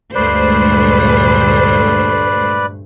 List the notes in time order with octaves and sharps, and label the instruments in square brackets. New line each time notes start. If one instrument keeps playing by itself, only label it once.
[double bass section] D2 A#2 G#3 [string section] G2 A3 [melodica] B4 D5 [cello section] C5